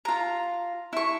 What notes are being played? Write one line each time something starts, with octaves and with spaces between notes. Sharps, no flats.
F4 A#5
E4 C#6